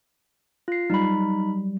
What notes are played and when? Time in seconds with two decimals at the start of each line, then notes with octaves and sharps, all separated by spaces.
0.68 F4 C7
0.90 F#3 G3 D#4 B5